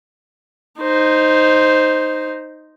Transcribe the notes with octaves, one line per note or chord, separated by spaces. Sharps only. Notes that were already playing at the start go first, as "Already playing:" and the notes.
D#4 C5